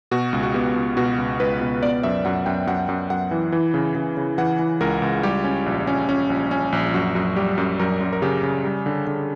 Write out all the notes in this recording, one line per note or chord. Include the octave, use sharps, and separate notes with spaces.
B2 F#4
C#2
F#4
B3 G4
C#2
B2 F#4
C#2
C#2 B4
B2
B3 D5
F#2 E5
F#2 F#5
F#2 G5
F#2 F#5
F#2
F#2 F#5
E3
E3
C#3
C#3
C#3
E3 F#5
E3
C#2 A#4
C#2
G3 G4
C#4
A#1
C#4
C#4
A#1
C#4
A#1
F#2 F#4
F#2
G3 G4
F#2
F#2 A#4
F#2
A#4
C#3 G4
C#3
G3
D3
D3